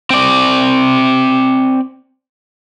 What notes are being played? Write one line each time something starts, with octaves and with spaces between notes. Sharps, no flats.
C4 D5